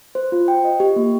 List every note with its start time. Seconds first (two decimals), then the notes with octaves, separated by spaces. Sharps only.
0.15 C5
0.32 F4
0.48 G5
0.64 D#5
0.80 G4
0.96 A#3